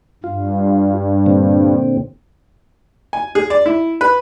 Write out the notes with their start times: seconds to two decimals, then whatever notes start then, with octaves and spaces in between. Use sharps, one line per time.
0.24 G2 F4
1.26 A#2 D3 C4
3.13 G#5
3.35 G#4
3.50 D5
3.66 E4
4.01 B4